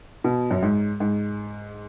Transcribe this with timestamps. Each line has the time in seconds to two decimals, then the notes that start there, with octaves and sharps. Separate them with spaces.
0.24 B2
0.51 F#2
0.63 G#2
1.00 G#2